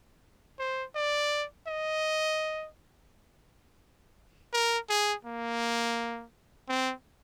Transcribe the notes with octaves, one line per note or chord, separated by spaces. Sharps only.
C5
D5
D#5
A#4
G#4
A#3
C4